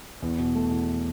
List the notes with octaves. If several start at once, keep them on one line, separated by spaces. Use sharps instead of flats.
E2
B2
A3
E2